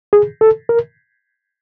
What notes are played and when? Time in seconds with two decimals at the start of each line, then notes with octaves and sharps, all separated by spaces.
0.13 G#4
0.41 A4
0.69 A#4